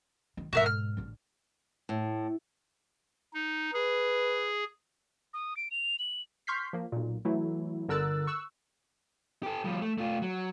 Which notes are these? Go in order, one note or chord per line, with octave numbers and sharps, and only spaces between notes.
D#3
G#2 B2 F#4 A#4 E5
F6
A1 D3
A2
D#4
G#4 B4
D#6
D7
F7
F#7
C6 C#6 F6 G6 B6 C7
F3 A#3
B1 A#2
E3 F#3 A3 E4
G1 D3 A#4 E6 F#6 A6
C#6 E6 F#6
G4 A4
F3 G3
A3
A3 F4
F#3